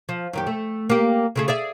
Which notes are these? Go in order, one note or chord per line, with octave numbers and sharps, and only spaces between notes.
F3
F#2 D#3 G4
A3
A#3 G4
C#3 A3 G#4
G#4 D5 E5